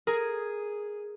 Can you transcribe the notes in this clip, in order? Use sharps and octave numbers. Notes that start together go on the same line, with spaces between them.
G#4 A#4